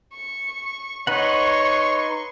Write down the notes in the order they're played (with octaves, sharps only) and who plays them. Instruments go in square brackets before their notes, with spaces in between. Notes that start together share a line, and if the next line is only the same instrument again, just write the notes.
[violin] C#6
[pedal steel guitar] D#4 B4 F#5 [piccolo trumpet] C#5 [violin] C6 C#6